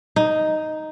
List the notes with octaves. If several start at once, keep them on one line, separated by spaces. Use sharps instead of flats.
D#4